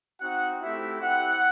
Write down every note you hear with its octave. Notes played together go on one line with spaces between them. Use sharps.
C4 D#4 F#4 F#5
A3 C4 E4 G4 E5
C4 E4 G4 F#5